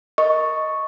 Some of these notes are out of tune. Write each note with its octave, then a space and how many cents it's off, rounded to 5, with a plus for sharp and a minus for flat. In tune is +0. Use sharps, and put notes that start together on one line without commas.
A#4 +0 D#5 +5 C#6 +0